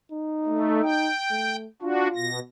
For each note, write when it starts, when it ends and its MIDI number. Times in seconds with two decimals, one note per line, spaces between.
0.12 1.10 63
0.46 0.81 57
0.83 1.56 79
1.30 1.66 57
1.82 2.08 62
1.82 2.28 65
1.82 2.08 66
2.16 2.40 47
2.16 2.40 94